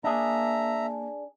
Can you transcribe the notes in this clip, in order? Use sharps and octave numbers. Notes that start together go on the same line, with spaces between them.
A#3 D4 G#4 E5 A#5